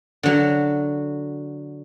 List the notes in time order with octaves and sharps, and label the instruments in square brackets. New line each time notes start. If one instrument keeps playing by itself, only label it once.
[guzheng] D3 F#3